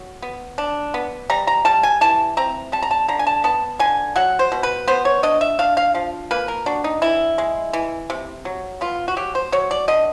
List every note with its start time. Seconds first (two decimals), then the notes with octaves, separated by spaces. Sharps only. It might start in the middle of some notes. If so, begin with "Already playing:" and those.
Already playing: F#3
0.22 B3
0.58 D4
0.94 B3
1.30 G3 A#5
1.47 A#5
1.65 G3 A5
1.83 G#5
2.01 E3 A5
2.37 C4 A#5
2.72 G3 A5
2.83 A#5
2.91 A5
3.08 D3 A#5
3.19 G#5
3.27 A5
3.44 B3 A5
3.80 D3 G#5
4.16 F#3 F#5
4.39 C5
4.52 B2
4.63 B4
4.88 B3 C5
5.05 C#5
5.23 D4 D#5
5.41 E5
5.59 D4 F5
5.77 F5
5.94 F3 F5
6.31 A#3 B4
6.48 A#4
6.66 D4 F#4
6.84 D#4
7.02 E3 E4
7.38 G#3
7.73 E3
8.10 C3
8.45 F#3
8.81 B3 F4
9.08 F#4
9.17 F#3 G4
9.35 C5
9.52 F#3 C#5
9.71 D5
9.88 D3 D#5